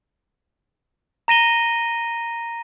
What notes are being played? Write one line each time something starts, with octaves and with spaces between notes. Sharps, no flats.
A#5 A#6 D#7 G7